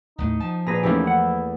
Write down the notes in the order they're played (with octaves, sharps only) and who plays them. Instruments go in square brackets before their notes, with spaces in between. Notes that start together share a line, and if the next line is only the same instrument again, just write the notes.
[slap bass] D#2 A2 [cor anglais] D#4
[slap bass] F3 [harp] A5
[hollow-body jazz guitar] A#2 B4 [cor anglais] G#4 [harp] A#5 A#6
[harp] E2 A3 A#3 [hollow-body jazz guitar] D#3 C#4 G4 [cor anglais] E4
[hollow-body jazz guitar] F#5